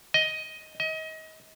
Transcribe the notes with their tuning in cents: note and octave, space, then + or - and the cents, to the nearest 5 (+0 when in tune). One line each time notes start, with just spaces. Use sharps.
D#5 +10
D#5 +30